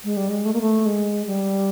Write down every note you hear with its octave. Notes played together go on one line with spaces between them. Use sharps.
G#3
G3
G#3
A3
A#3
A3
G#3
G3